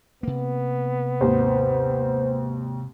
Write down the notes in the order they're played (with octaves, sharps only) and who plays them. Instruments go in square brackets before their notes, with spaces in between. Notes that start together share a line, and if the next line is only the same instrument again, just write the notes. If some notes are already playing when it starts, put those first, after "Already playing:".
[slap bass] C3 A#3 [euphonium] B3
[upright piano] G#1 D#2 [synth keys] C5